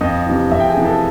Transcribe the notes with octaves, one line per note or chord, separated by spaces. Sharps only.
F2 D#5
C3 E3
F2 E5
G5
G#4 G#5
C3 E3
A4 A5